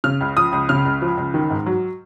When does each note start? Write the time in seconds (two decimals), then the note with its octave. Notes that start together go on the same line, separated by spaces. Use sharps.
0.04 C#3 F6
0.21 C#2
0.37 F3 D#6
0.53 C#2
0.69 C#3 F6
0.85 C#2
1.02 F3
1.17 C#2
1.34 D#3
1.50 G#2
1.66 F#3